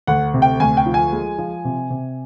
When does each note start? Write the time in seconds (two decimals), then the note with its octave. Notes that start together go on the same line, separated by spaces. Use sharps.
0.07 D2 F#5
0.34 C3
0.42 G5
0.60 D2 G#5
0.77 G5
0.86 F3
0.94 G#5
1.13 G#3
1.38 F3
1.65 C3
1.90 C3